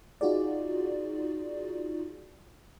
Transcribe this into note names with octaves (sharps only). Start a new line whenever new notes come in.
D#4 F4 F#4 G#4 D5